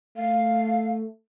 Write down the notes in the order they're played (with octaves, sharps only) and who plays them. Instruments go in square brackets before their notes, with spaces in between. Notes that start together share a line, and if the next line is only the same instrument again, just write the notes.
[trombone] A3 [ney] F5